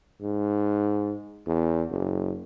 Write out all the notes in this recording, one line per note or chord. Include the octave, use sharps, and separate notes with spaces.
G#2
E2
F#1